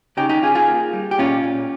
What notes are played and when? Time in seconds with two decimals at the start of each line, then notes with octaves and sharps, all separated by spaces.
0.17 C#3 D#4 G4
0.29 D#4 G4
0.42 C#3 F4 G#4
0.55 F4 G#4
0.68 A#3
0.93 G3
1.11 G4
1.18 A#2 C#4 F4
1.44 A#2